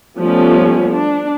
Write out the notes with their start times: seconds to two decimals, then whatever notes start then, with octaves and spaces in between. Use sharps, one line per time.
0.18 F3 G3 A3 B3 C#4
0.92 D4